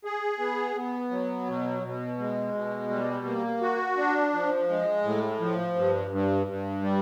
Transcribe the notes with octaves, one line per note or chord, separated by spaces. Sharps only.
G#4
B3
B3
F#3
B2
B2
G#3
B2
G3
A#3
F#4
D4
F3
G#3
A2
F3
G2
G2
G2
G3